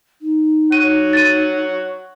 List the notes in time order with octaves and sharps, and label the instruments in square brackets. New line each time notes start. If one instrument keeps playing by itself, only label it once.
[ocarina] D#4
[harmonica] C#5 F#5 [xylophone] D#7
[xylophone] A6 D#7